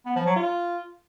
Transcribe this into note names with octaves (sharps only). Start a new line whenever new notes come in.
B3
F3
F#3
F4